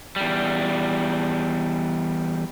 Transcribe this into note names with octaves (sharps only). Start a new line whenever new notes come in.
E2 G3